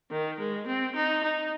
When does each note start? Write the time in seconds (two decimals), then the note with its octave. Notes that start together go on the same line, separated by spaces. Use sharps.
0.11 D#3
0.39 G#3
0.67 C4
0.95 D#4
1.23 D#4